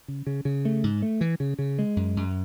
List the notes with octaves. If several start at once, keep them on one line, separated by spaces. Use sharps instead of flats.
C#3
C#3
C#3
A3
G#2
A3
E3
C#3
C#3
G#3
F#2
F#2